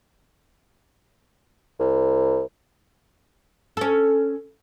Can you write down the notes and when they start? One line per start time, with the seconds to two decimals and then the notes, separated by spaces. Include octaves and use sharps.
1.80 C2
3.77 C#4 A4